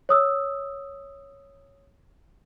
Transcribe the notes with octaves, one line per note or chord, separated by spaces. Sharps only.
C#5 D#6 E6